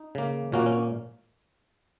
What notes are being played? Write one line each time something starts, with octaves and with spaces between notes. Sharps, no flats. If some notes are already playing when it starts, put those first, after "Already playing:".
Already playing: D#4
C#3 A#3
A#2 A#3 C#4 F#4
C#4